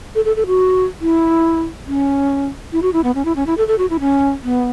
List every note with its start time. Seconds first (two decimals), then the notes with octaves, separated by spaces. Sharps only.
0.15 A4
0.25 A4
0.36 A4
0.47 F#4
1.01 E4
1.87 C#4
2.72 E4
2.82 F#4
2.93 E4
3.04 B3
3.15 C#4
3.25 E4
3.36 C#4
3.47 E4
3.57 A4
3.68 A4
3.78 F#4
3.90 E4
4.00 C#4
4.43 B3